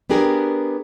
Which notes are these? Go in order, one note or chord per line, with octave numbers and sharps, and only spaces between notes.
B3 D4 G4 G#4 A#4